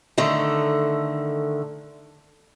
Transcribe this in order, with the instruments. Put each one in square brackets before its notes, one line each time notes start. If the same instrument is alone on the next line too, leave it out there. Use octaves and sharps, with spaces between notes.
[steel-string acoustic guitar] D3 D#3 A3